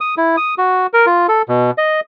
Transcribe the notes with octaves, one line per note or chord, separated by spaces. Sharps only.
D#6
E4
D#6
F#4
A#4
F4
A4
B2
D#5